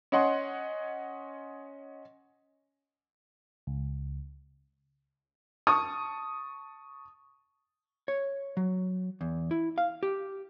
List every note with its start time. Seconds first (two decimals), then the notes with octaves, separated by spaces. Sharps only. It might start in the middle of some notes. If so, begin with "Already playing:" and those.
0.12 C#4 C#5 D#5 F#5 C6
3.67 C#2
5.67 A5 C#6 D#6
8.08 C#5
8.57 F#3
9.21 E2
9.51 E4
9.78 F5
10.03 G4